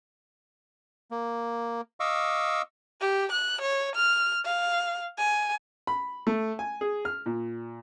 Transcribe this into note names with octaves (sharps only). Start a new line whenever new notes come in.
A#3
D#5 F5 C#6 D6 E6
G4
F#6
C#5
F6
F5
G#5
B5
A3
G#5
G#4
F6
A#2